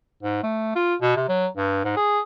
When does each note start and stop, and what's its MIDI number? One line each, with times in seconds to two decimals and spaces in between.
0.23 0.40 44
0.43 0.73 57
0.75 0.95 65
1.02 1.15 47
1.16 1.28 48
1.29 1.47 54
1.57 1.83 43
1.84 1.92 44
1.97 2.20 68